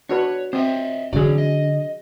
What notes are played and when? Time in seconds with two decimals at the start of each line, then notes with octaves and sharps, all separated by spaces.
0.09 D4 F#4 B4 C#5
0.53 C4 C5 D#5 E5
1.13 D3 E3 F#3 G#4 D5
1.38 D#5